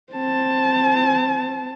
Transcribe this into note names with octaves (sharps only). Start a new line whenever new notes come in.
C4 A5